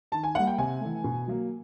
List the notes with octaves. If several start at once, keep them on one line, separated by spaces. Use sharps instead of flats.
D#3 A5
G#5
G3 A#3 F#5
G5
C3 G#5
E3 A3
B2
F#3 A#3